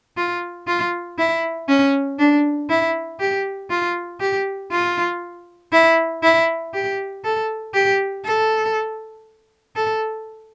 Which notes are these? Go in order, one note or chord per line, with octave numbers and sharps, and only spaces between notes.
F4
F4
E4
C#4
D4
E4
G4
F4
G4
F4
E4
E4
G4
A4
G4
A4
A4